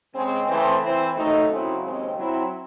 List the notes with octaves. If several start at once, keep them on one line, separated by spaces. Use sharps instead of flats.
C#3 G#3 C4
C#3 E3 A3 C4
E3 C4 E4 C5
D#2 D#3 F#3 A3 D#4
F#2 C#3 F#3 C4 E4
D#2 C#3 G#3 C4
F#3 C4 E4